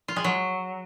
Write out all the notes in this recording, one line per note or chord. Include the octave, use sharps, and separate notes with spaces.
F4
G#3
F#3